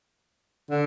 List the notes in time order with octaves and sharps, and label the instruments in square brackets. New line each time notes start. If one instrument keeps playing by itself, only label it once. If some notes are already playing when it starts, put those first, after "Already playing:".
[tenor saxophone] D3